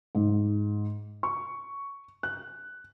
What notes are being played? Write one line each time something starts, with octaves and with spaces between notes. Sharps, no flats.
G#2
C#6
F#6